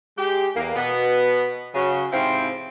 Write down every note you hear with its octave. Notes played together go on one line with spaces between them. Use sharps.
G#3 G4
E2 A#3
B2 B3
C#3 F#3
G#2 C3 F3 C4 E4 F4